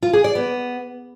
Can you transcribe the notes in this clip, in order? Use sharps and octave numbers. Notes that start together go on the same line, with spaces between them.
F4
G#4
D5
B3